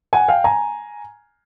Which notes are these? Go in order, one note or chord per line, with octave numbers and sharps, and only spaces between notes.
F#5 G#5
F5 G5
G#5 A#5